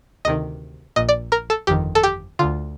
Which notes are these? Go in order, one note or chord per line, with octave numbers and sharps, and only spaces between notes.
D2 C3 D#3 D#5
A#1 A#2 D#5
D5
A#4
A4
G1 F2 D#3 G4
A4
G4
D2 D3 F4